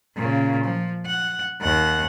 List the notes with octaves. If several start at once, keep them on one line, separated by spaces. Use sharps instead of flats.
A#2 C#3
F3
F#5
D#2 F#5